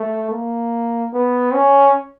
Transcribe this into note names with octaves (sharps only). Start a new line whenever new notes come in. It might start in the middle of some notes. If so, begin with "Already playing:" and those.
Already playing: A3
A#3
B3
C#4